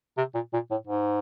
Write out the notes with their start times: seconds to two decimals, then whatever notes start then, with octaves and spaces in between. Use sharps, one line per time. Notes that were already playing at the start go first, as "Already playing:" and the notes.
0.18 C3
0.35 A#2
0.53 A#2
0.71 A2
0.87 G#2